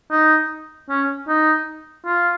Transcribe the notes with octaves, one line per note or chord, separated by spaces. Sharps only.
D#4
C#4
D#4
F4